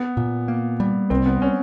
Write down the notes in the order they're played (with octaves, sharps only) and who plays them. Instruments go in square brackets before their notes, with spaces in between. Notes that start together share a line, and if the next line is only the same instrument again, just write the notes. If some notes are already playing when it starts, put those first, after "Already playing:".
Already playing: [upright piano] B3
[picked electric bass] A#2
A#3
G3
[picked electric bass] C2 [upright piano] C4
[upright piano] B3
C#4